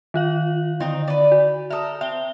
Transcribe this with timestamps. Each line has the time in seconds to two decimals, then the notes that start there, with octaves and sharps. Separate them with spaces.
0.14 D#3 F4 F5
0.80 D3 C4 D#4
1.08 B4 D5
1.32 F#4
1.70 A4 A#4 E5 D#6
2.01 C4 E5 G7